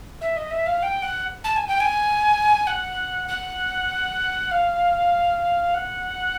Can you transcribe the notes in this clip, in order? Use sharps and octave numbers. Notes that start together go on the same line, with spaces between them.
E5
D#5
E5
F5
G5
F#5
A5
G#5
G5
G#5
F#5
F#5
F5
F#5